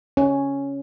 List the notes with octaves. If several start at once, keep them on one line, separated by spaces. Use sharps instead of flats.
C#4